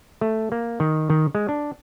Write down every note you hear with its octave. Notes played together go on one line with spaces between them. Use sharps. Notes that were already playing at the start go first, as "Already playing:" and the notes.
A3
A#3
D#3
D#3
G#3
D4